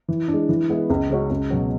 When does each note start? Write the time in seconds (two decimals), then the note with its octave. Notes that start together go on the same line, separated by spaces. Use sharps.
0.08 E3
0.28 D4
0.33 G#3
0.49 E3
0.69 G#3 B3 E4
0.90 C#2
1.10 C#3 G#3 C#4 F#4
1.30 C#2
1.50 B2 F#3